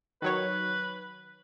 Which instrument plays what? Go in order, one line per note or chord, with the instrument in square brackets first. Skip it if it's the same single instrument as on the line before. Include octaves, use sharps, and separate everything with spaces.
[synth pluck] D#3 F#3 C#5 [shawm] B4